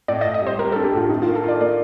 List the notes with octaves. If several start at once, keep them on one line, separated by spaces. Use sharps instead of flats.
A2 D5
D#5
A2
D#5
G3 C5
G3 A#4
A4
D4
G4
A2 F4
D#3 D#4
F4
A#3
A4
F4 D5
A#3 D5